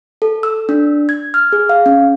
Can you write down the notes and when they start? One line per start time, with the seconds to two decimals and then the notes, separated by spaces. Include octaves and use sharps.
0.22 A4
0.43 E6
0.69 D4
1.09 G#6
1.34 F6
1.53 G#4
1.69 F5
1.86 C#4